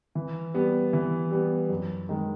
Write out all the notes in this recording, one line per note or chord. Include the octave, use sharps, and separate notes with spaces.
E3
G3 B3
E3
G3 B3
F#2
D#3 G#3